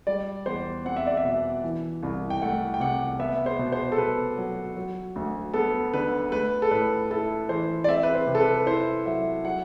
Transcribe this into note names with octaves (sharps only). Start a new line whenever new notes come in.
G3 D5
E2 C5
C4 F#5
E5
D5
E5
B2
E3
C2
G5
A3 F#5
G5
C3 F#5
B3 E5
C5
B2
C5
A4
B2 B4
F#3
F#3
D2
B3 A4
D3 B4
A3 B4
A4
A2 B4
E4 A4
E3 C5
D5
C4 E5
B4
C5
C3
A4
B4
B4
E4 C5
F#3 E5
F#3 F#5